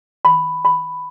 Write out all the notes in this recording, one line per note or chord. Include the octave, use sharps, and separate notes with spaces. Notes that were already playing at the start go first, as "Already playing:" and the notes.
B5
B5